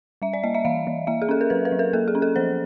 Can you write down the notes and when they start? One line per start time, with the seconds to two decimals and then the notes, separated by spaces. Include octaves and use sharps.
0.22 G3 E5
0.33 D5
0.43 A#3 D#5
0.55 E5
0.65 E3 F5
0.87 E3
1.07 A#3 E5
1.22 G#4
1.29 C#4 A4
1.41 A#4
1.50 F#3 B4
1.65 B4
1.72 F#3
1.79 A#4
1.93 A#3 A4
2.08 G#4
2.15 C#4
2.22 A4
2.36 F3 C5